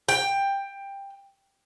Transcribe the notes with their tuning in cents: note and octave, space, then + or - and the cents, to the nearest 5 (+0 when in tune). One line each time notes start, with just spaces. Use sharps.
G5 +15